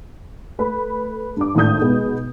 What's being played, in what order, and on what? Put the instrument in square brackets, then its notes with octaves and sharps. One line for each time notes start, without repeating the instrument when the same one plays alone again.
[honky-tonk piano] A3 B4 B5
G2 D6
G#1 A2 D4 D#6 G6
B2 G#3 B3 D#4